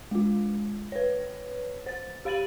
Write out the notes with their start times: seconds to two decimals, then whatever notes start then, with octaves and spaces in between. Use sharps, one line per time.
0.11 G#3 F4
0.92 B4 C#5
1.86 C5 A6
2.25 G4 F5 B5 A6 D#7 F#7